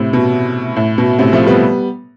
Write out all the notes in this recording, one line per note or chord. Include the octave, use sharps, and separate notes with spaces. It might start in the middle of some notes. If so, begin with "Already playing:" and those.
Already playing: A2 C3
B2
A2
B2
A2 C3
F3 A3
G3 B3